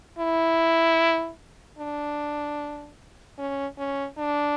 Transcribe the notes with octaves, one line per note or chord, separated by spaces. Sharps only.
E4
D4
C#4
C#4
D4